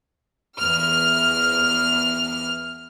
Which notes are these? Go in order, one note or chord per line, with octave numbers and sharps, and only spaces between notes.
E2 F6